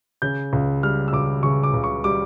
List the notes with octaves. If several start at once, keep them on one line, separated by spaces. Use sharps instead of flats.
C#3 G6
C#2
G3 F6
E6
C#2 D6
C#3 C#6
D6
C#2
C#6
G3 D6